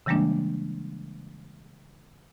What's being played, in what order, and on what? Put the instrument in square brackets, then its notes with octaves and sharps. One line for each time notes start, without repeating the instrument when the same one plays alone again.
[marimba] C#3 E3 G3 G#3 A#3 D4